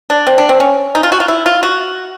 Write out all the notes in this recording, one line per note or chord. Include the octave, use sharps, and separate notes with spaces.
D4
C4
D4
C4
C#4
D#4
F4
F#4
F4
E4
F4
F#4